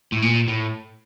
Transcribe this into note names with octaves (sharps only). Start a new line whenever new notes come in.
A2
A#2
A2